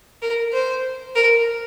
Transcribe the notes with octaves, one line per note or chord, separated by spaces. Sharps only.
A#4
C5
A#4